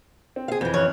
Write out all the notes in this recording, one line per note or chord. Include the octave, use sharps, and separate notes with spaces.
C4
G#4 F5
F2 E3 G6 G#6
A1 C#5 F6 F#6